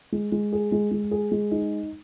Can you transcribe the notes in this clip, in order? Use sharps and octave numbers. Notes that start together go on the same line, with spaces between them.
G#3
G#3
G#4
G#3
G#3
G#4
G#3
D#4